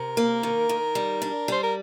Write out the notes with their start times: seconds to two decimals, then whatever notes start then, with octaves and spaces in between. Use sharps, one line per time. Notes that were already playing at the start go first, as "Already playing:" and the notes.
Already playing: C3 A#4
0.17 A#3
0.43 D#3
0.69 D#3
0.95 G3
1.22 D4
1.48 G3 C5
1.63 A#4